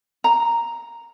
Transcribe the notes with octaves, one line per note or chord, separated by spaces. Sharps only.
A#5